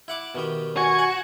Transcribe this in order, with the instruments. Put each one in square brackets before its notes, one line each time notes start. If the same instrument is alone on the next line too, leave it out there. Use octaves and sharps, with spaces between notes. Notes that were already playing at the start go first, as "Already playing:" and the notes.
[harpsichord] E4 F#5 D6
B2 D#3 G4
[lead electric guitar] F#4 [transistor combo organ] G#5 C#6
[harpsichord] F#5